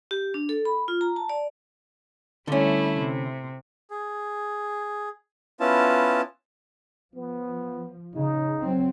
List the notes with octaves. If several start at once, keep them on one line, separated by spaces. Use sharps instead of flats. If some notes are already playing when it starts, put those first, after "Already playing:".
G4
D4
A4
B5
F4
A#5
A5
D5
D3 G3 A3 C#4 E4
C3
G#4
B3 C#4 E4 F4 A5
F3 B3
C#3 D#4
F#3 C4